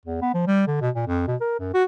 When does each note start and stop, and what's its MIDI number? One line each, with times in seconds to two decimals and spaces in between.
0.05 0.21 40
0.22 0.31 59
0.34 0.46 53
0.47 0.67 55
0.67 0.79 50
0.81 0.90 47
0.95 1.07 46
1.07 1.25 41
1.28 1.36 47
1.41 1.55 70
1.59 1.74 42
1.74 1.84 66